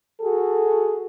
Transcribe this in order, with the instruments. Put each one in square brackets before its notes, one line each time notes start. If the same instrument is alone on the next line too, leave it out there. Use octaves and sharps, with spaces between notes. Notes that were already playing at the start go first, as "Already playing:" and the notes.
[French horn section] F#4 G#4 A4